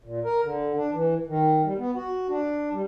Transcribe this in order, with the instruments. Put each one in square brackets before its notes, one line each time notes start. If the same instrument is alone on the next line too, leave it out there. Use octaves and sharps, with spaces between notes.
[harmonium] A#2
A#4
D3
D4
E3
D#3
G3
B3
F#4
D4
G3